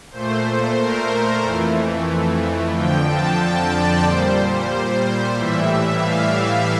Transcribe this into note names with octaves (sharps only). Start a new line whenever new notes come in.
A#2 A3 C5
A#4
F2 E3 A3
F2 D3 F3 G5
A5
D5
A#2 G3 C5
A2 E3 G3 E5
F5